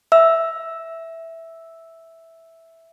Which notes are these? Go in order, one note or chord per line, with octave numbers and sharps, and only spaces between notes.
E5 E6